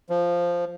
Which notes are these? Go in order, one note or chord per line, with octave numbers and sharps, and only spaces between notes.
F3